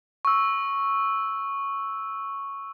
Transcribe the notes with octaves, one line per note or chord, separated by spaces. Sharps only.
C#6 E6